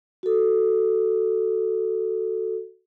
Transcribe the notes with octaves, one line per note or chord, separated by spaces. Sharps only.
F#4 A4